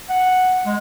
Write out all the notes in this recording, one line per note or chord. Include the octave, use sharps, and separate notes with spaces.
F#5
G#3